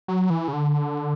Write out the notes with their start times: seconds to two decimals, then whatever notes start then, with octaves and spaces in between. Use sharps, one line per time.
0.08 F#3
0.30 E3
0.48 C#3
0.53 D3